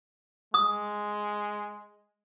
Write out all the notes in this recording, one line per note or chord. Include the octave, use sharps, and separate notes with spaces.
G#3 D#6